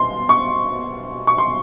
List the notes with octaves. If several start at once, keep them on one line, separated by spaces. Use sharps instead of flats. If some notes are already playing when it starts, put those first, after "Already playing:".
Already playing: B2 C6
C#6
C#6
C6